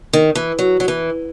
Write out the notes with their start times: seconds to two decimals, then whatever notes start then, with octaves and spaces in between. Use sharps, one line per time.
0.13 D#3
0.35 E3
0.59 F#3
0.80 F#3
0.88 E3